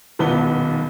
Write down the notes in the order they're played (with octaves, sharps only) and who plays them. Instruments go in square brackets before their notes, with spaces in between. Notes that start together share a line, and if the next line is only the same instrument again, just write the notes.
[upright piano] D#1 B1 B3 B4 G7